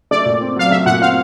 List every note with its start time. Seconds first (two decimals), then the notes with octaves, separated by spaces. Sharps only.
0.11 A3 D5
0.25 A#2
0.41 C4
0.56 F#3 F5
0.71 A3 E5
0.86 A#2 F#5
1.01 C4 F5